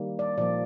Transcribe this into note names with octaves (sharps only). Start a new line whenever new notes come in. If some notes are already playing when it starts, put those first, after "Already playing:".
Already playing: D#3 G3 A#3
D5
A#2 F3 A#3 D5